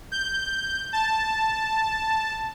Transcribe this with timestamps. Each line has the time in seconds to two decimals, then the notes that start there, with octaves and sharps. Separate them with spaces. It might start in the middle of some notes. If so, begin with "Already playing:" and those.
0.12 G6
0.93 A5